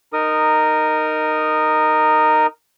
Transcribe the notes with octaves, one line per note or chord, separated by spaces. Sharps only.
D#4 A#4 D#6